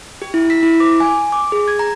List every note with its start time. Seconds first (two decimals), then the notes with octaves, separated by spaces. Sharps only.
0.22 G4
0.34 E4
0.50 B6
0.63 E4
0.80 D6
1.00 G#5
1.32 D6
1.52 G#4
1.68 G#6
1.79 A#5